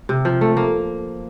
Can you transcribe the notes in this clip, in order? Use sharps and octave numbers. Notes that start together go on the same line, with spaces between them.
C3
F3
A3
A#3